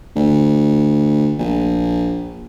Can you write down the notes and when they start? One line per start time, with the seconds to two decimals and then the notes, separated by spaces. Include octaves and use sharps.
0.16 D2
1.39 A#1